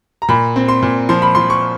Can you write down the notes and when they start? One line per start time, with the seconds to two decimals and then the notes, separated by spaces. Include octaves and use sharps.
0.22 A#5
0.29 A#2 B5
0.56 C4
0.69 C6
0.82 A#2
1.09 F3 C6
1.22 B5
1.35 F3 C6
1.50 C#6